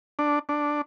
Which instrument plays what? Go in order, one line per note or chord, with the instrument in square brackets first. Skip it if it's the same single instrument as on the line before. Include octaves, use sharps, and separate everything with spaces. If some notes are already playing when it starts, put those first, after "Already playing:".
[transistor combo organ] D4
D4